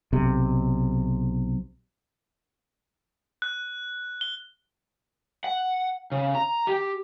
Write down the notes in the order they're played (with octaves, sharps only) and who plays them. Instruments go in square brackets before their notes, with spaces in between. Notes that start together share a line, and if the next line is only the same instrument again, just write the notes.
[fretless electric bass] B1 C3
[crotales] F#6
G7
[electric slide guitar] F#5
C#3
A#5
G4